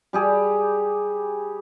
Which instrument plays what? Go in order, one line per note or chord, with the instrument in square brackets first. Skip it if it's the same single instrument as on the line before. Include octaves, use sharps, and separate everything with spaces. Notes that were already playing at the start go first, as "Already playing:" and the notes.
[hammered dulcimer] G3 G4 G#4